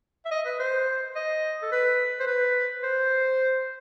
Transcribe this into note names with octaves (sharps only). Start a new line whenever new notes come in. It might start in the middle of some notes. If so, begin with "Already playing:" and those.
E5
D#5
B4
C5
D#5
A4
B4
C5
B4
C5